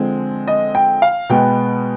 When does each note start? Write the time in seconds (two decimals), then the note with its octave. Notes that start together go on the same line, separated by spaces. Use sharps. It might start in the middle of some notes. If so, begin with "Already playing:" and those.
Already playing: D3 F3 G#3 C4
0.47 D#5
0.75 G5
1.02 F5
1.29 B2 G#3 B3 G5